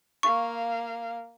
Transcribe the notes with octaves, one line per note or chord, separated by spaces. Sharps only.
A#3 F5 C#6